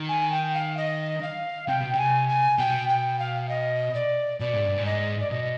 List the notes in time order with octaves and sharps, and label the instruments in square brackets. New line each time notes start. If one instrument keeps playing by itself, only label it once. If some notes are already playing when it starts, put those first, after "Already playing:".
Already playing: [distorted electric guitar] D#3
[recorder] G#5
G5
F5
D#5
F5
[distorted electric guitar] C3 [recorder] G5
[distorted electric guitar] B2
[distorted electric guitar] C3 [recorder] G5
[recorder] G#5
G#5
[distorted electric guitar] B2 [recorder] G5
[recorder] G5
F5
D#5
D5
[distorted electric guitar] B2 [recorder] D5
[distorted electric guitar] G#2
G2
G#2
[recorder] D#5
D5
[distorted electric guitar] B2 [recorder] D#5